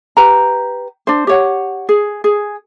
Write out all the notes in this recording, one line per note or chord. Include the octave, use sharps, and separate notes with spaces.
G4 B4 A#5
D4 C5
G4 C#5 F#5
G#4
G#4